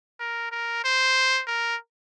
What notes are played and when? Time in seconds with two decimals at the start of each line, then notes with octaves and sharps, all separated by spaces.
0.20 A#4
0.52 A#4
0.84 C5
1.47 A#4